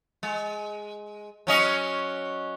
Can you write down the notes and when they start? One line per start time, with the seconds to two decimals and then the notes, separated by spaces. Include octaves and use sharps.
0.23 G#3
1.47 F#3 C#4 D#5